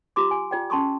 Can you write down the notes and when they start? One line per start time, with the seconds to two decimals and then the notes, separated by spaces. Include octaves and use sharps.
0.16 F4 G4 C6 D6
0.31 G#5
0.51 F4 D5 G5
0.70 C#4 A5 C6 C#6 D#6